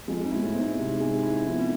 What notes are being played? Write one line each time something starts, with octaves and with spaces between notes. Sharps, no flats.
F2 G#3
G#2
E4
B2
A2
C4
G#2
C3
G#3
E4
F2 B3